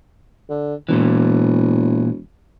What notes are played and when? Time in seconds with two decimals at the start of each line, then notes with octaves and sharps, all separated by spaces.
0.49 D3
0.89 E1 A#2 E3